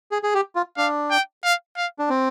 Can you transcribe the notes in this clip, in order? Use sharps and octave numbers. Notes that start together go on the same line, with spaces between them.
G#4
G#4
G4
F4
D4 F5
G5
F5
F5
D4
C4